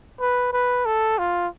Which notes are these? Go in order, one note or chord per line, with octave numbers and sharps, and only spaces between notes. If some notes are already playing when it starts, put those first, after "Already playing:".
B4
B4
A4
F4